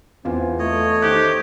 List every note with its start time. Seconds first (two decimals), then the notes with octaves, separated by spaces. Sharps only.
0.25 E2 C4 F4 G#5
0.59 A3 C#5 D#5
1.02 D#3 G4 C5 F#6